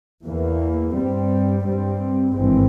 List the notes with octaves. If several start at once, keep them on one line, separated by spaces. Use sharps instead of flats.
E2 E3 A#3
G2 G3 C4
G2 G3 C4
G#1 G2 E3 G#3 C4